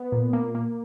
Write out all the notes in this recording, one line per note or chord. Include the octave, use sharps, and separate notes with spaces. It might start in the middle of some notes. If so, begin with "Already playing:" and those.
Already playing: B3
A#2
A#3
A#3